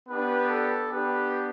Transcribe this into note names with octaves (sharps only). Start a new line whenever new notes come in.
B3 D4 G4 B4
A4
B3 D4 G4 B4